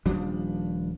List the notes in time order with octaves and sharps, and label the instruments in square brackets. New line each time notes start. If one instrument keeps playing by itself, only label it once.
[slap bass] D#1 F3 G3 D4